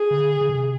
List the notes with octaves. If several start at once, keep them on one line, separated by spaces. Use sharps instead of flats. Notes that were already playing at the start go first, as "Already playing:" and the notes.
Already playing: G#4
D3
D3
C3